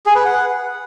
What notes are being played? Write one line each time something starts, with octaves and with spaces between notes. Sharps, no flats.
G#4
B4
F#5